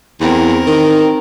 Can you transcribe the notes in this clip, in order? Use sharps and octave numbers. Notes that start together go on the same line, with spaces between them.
E2 C4 A#4
D#3